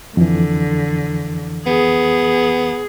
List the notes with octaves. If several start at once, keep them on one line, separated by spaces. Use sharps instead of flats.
F2 D3 E3
B3 G#4